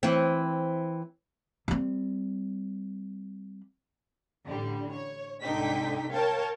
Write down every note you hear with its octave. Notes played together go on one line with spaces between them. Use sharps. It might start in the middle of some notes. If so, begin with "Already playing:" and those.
E3 C4
G3 C4
A1 D3 G3
C#5
C2 G#2 D3 D#4 G5 B6
A#4 C#5 F5 G5 A5